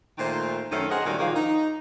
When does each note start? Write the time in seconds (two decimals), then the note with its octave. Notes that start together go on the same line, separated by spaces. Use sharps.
0.18 A#2 D#3 A3 C5
0.71 F#2 D#3 A3 C4 C#4 A4
0.90 G#4 A#4 C5 D#5 E5 F#5
1.06 A#2 D#3 G3 C#4 F#4
1.18 A#2 D#3 F3 A#3 G#4 F5
1.35 D#4